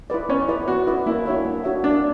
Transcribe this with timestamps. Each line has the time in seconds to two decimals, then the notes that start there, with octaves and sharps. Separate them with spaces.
0.10 E4 B4 D5
0.29 B3 C#4
0.48 E4 B4 D5
0.68 B3 F#4
0.87 E4 B4 D5
1.06 A#3 E4
1.26 D4 F#4 C#5 E5
1.45 A#3
1.64 D4 F#4 C#5 E5
1.83 A#3 D4